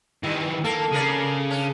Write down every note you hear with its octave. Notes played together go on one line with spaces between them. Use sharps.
D#3 E3 G3
A#3 A4
C#3 G#4 A#4 D5
C#4 D4